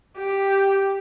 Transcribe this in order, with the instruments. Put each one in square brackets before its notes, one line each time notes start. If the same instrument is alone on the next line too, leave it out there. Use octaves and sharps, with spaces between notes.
[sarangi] G4